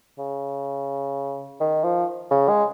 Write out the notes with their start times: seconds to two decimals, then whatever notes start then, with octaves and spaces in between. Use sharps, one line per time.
0.18 C#3
1.60 D#3
1.84 F3
2.31 C#3
2.49 G#3